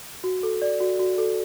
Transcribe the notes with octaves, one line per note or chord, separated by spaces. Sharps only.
F#4
A4
D5
F#4
F#4
A4